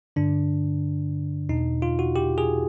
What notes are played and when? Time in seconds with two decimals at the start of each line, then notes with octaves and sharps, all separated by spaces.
0.16 G2 D3 D4
1.49 E2 B2 D#4
1.82 F4
1.99 F#4
2.16 G4
2.38 G#4